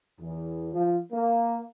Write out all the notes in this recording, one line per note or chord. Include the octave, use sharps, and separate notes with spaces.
E2
F3
A#3